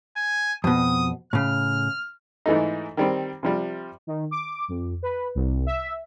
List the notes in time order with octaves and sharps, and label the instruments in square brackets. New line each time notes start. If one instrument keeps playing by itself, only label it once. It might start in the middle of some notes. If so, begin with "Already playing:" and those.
[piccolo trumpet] G#5
[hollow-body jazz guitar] F2 B2 [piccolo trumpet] D#6
[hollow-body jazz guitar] A2 C#3 [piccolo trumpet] F6
[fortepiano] G#2 E3 A3 D#4
D#3 G3 C4
C3 F3 G3
[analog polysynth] D#3
D6
F2
B4
C2
E5